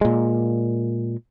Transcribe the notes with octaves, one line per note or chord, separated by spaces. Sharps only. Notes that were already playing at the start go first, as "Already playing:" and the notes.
A#2 G#3